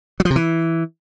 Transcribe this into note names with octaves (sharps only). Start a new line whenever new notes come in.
F#3
F3
C3
E3